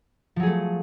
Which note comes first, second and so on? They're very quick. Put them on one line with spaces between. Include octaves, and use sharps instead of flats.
F3 F#3 G#4 A3